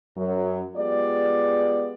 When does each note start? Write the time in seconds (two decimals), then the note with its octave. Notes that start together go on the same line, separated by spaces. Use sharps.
0.16 F#2 F#3
0.76 G#3 B3 F4 G4 D5